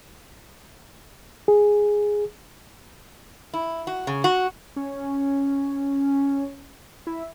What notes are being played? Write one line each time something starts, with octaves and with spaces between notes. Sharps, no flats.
G#4
E4
F#4
C#3
F#4
C#4
E4